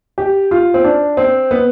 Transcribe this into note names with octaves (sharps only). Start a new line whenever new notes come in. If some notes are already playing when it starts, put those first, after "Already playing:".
G4
F4
C4
D4
C4
B3